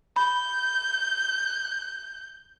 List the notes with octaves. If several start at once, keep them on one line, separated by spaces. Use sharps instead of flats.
B5 G6